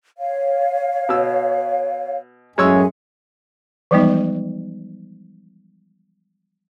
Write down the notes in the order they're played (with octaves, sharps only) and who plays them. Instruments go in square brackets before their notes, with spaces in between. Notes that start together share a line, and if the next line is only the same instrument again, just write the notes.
[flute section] C#5 F5
[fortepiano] B2 E6
[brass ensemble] F#2 A2 [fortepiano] G#3 C#5 E6 [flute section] G#4 E5 G#5
[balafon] E3 F3 G3 G#3 B3 D#4